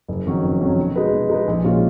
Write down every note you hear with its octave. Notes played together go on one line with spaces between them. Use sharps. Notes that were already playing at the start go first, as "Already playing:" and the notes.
F#1
F2 D#3 F#3 C#4
F#1
F2 D#3 F#3 C#4
B2
G#3 D#4 G#4 B4
B2
G#3 D#4 G#4 B4
A#1
A#2 G#3 C#4 F4